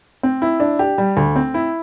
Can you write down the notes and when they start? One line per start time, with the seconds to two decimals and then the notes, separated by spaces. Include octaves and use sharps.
0.23 C4
0.42 E4
0.60 D4
0.79 G4
0.98 G3
1.17 D2
1.36 C4
1.54 E4